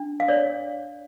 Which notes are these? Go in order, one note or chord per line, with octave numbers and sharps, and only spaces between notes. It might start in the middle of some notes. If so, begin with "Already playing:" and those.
Already playing: D4
F5
C#5 D5